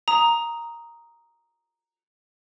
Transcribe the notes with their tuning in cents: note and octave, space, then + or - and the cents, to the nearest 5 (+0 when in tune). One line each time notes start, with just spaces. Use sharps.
A#5 +0 D#6 +5